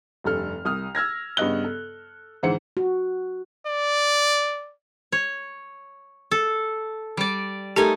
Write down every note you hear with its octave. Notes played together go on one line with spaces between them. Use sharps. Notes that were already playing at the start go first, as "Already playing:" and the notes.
F1 G2 C3 A4 F6
C2 D#6 F6
E6 F6 G#6 A#6
G2 C#3 B3 D#5 F#6 G7
A4
G#2 D3 E3 C5 F#5 C#7
F#4
D5
C#5
A4
G3 D5
A3 D#4 G4 A#4 G#5